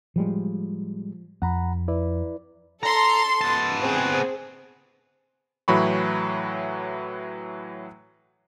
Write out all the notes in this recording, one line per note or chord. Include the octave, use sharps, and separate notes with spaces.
A2 F3 G3 G#3
F2 F#5 A#5 B5
E4 B4 D5
A4 A#5 C6
B3 A5
C4 G#4
A2 E3 F#3 B5 C#6